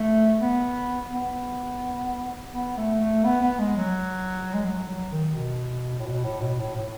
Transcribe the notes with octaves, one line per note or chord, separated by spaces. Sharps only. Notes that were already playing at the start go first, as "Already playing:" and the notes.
Already playing: A3
B3
B3
B3
A3
A3
B3
B3
G#3
F#3
G#3
F#3
F#3
D#3
B2
A2
B2
A2
B2
A2
A2